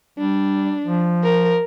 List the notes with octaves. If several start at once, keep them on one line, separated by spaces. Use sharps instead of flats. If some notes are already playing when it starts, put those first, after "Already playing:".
G3 D4
F3
A#4